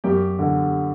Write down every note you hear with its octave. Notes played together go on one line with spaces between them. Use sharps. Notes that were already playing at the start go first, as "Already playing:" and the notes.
F#2 G4
D3